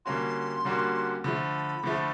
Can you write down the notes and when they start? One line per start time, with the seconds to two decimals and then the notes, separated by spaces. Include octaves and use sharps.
0.05 D3 G3 A#3 C#4 F#4 C6
0.65 D3 G3 A#3 C#4 F#4
1.24 D3 F3 A3 B5
1.84 D3 F3 A3